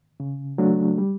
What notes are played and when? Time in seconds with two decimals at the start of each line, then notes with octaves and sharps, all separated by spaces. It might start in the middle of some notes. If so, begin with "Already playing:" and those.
0.20 C#3
0.58 F#3 A3 D4
0.98 G3